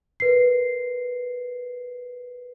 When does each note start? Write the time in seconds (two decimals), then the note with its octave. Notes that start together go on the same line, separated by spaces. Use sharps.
0.20 A#4 B4 C7